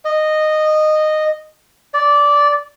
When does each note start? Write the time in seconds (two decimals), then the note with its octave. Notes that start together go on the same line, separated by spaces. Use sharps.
0.05 D#5
1.94 D5